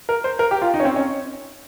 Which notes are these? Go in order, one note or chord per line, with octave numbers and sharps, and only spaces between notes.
A#4
C5
A#4
G4
F4
D#4
C#4
C4
C#4